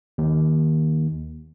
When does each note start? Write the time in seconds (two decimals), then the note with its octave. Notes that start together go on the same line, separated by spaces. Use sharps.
0.18 D#2